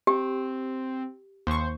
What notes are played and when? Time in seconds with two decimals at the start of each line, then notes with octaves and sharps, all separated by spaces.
0.07 C4 G4
1.47 D#2 C5 C#6